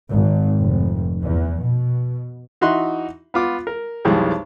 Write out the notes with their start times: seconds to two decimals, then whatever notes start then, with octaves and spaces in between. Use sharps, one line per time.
0.13 G#1
0.61 F1
1.24 E2
1.61 B2
2.61 E3 D#4 F#4 E5 C6 F#6
3.34 B3 F4 D6
3.67 A#4
4.05 B1 F2 E3 G3 G#3